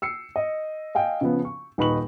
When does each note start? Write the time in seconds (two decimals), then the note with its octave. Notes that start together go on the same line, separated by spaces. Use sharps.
0.02 E6 C7 C#7
0.36 D#5
0.95 D#5 F5 G5 G#5
1.21 C#3 F3 B3
1.45 C#6
1.78 D#1 D#4 B4 B5 C#6 F#7